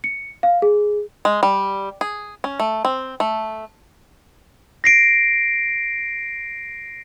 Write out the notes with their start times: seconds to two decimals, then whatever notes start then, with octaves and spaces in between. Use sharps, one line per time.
0.04 C#7
0.43 F5
0.62 G#4
1.25 G#3
1.43 G3
2.01 G#4
2.44 C#4
2.60 A3
2.85 C4
3.20 A3
4.84 A#6 C7 D7